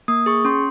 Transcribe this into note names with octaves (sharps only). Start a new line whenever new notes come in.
A#3 D#6
G#4 C#6
C#4 C6